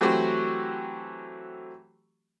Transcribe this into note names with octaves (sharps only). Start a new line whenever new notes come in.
E3 F#3 A3 C4 F#4 G4